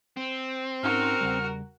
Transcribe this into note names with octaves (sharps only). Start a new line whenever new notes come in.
C4
G#2 C#4 D#4 F#4 A#4 F6
E2 C#3 G3